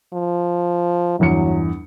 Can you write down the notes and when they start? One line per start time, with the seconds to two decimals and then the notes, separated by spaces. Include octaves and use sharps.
0.13 F3
1.19 G1 E2 F#3 C#7